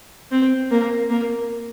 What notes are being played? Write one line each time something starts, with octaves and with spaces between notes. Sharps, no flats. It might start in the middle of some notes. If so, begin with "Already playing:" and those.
C4
A#3
A#3